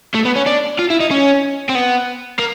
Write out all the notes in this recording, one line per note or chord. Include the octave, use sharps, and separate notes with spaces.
A3
B3
C#4
D4
F4
E4
D#4
C#4
C4
B3
A#3